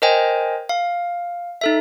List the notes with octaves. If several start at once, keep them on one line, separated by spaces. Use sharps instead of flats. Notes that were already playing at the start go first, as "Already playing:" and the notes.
A#4 C5 D#5 G5 G#5
F5
D#4 A4 E5